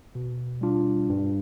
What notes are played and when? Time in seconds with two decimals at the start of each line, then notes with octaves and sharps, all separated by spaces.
0.15 B2
0.61 G3 D4 F4
1.09 G2